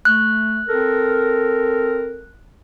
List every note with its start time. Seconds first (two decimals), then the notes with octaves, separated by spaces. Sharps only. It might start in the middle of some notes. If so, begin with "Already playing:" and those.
0.05 A3 F#6
0.69 C4 A4 A#4